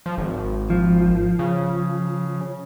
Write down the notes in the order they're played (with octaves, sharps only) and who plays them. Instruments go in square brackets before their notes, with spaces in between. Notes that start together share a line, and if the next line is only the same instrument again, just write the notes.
[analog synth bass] F3
G#1
[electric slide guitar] F3
[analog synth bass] C#3